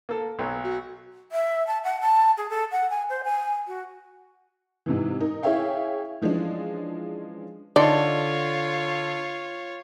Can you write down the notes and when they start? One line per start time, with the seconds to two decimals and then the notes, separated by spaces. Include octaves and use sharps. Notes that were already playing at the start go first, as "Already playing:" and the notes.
0.09 A#3 A4
0.39 B1 F#3
0.64 F#4
1.32 E5
1.67 A5
1.84 F#5
2.01 A5
2.38 G#4
2.50 A4
2.71 F#5
2.90 G#5
3.10 C5
3.24 G#5
3.67 F#4
4.86 G#2 C3 E3
5.20 D#4 A#4
5.43 E4 G#4 C#5 E5 F5 G5
6.21 E3 F3 G#3 C#4 D4
7.76 D3 D#4 F4 A4 C#5 D5 C6